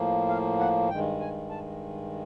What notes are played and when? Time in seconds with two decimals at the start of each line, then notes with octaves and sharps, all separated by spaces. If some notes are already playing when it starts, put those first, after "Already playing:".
Already playing: A2 F3 A#3
0.28 F5
0.59 F#5
0.90 G2 D#3 G#3 G5
1.20 G#5
1.50 A5